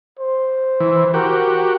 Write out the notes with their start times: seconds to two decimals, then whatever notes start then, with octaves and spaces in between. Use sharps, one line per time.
0.19 C5
0.80 E3
1.14 F#4 G4 A#4